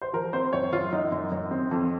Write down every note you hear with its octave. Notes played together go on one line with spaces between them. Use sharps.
C5
F3 A#4
C4 C5
F#2 C#5
F#2 F4
F#2 D#4
F#2
F#2
C4
F2